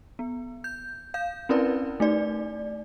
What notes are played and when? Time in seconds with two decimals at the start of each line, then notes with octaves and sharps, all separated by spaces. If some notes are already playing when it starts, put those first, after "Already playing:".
0.19 B3
0.64 G6
1.14 F5 G6
1.49 C4 C#4 E4 A#4 B4 D5
2.00 A3 D#4 D5